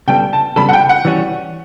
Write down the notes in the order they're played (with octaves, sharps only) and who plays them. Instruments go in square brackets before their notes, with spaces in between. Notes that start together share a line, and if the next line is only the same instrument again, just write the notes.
[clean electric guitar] C#3 G3 B3 D4 A4 [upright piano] G5
[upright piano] A5
[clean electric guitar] C#3 G3 B3 D4 A4 [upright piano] B5
[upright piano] F#5
G5
F#5
[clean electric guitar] E3 G3 C#4 F#4